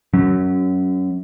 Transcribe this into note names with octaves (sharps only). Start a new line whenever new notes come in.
F#3 C#4